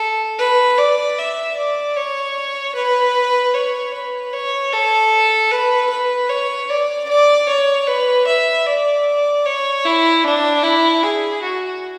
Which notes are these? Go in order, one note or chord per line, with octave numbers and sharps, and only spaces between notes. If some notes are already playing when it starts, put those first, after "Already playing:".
Already playing: A4
B4
D5
E5
D5
C#5
B4
C#5
B4
C#5
A4
B4
B4
C#5
D5
D5
C#5
B4
E5
D5
C#5
E4
D4
E4
G#4
F#4